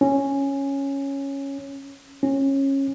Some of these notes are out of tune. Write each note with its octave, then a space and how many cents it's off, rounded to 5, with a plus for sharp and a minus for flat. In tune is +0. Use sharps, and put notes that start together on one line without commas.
C#4 -5
C#4 -20